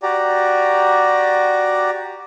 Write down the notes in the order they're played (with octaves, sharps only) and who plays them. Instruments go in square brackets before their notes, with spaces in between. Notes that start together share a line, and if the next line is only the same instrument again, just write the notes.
[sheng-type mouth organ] F#4 G4 D5 A#5